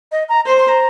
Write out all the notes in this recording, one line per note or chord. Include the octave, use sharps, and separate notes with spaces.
D#5
A#5
C5 C6
C6
A#5